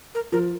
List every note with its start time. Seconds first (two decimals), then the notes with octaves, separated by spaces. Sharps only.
0.15 A#4
0.32 F3 A#4